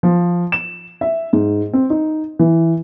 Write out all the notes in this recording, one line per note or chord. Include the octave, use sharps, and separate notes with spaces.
F3
E7
E5
G#2
C4
D#4
E3